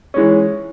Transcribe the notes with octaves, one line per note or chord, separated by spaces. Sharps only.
E3 G#3 C#4